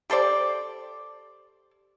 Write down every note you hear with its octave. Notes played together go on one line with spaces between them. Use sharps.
G4 A4 C5 D5